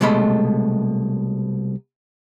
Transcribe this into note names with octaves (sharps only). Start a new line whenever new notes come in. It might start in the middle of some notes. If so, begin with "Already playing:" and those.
C2 B2 G#3 A3 D#5 B5